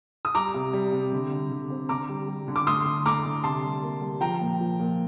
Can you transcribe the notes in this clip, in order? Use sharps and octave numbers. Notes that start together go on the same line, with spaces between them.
D#6
G3 A#5 D6
C3
G3
C3
D3
D3
D3
C4
D3 A#5 D6
G3
G3
D3
D6
A3 C6 D#6
D3
A3 A#5 D6
D3
C3 A5 C6
G3
A#3
G3
F3 G5 A#5
A#2
F3
A#2